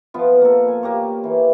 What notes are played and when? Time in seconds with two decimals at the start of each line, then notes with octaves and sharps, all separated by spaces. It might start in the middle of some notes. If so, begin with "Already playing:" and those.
0.14 F3 B3 F4
0.41 A#3 A4
0.68 G#5
0.83 A#3 G4 C#5
1.24 E3